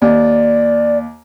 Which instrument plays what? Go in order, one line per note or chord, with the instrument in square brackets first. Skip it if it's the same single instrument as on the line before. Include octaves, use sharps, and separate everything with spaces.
[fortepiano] D#2 [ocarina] D5